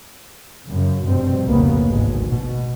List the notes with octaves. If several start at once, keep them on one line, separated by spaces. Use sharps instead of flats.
F#2 C#3
F1 G2 B2 C4
F1 C#2 A2 C#3 A#3 B3
G#1 D2 G#3
B2